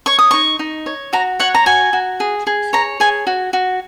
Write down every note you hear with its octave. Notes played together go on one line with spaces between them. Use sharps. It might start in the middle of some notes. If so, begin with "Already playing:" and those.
C#5 C#6
D#6
D#4 C#6
D#4
C#5
F#4 A#5
C#5 F#5
A#5
F#4 G#5
F#4
G#4
G#4
C#5 A#5
G#4 G#5
F#4
F#4